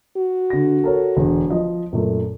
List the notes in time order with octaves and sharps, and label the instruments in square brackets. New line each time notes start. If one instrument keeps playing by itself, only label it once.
[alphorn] F#4
[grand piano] D3 A#6
A4 A#4 C#5
E1 D3
F3 D#5
F#2 A#2 A3